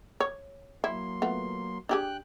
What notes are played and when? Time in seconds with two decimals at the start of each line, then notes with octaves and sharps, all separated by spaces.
0.20 C#5
0.84 F#3 A#3 E4 C6
1.22 A3 B3 F4
1.89 D4 G4 G#4 G5 F#6